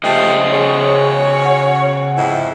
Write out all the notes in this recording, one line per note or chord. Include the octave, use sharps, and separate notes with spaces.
C#3 F3 G3 A3 C5 D#5 G5
C#4 F#4 G#4 C#5
F#5
F2 G#2 E4